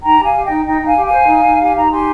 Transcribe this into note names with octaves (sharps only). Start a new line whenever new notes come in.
D#4 G5 A#5
G4 F5 G#5
G4
D#5 G5
D#4
D#4 D#5 G5
D#4
F5 G#5
G4
F5 G#5
C5
D#4
D#4
G4 G#5
D#4 A#5
G4 G#5 C6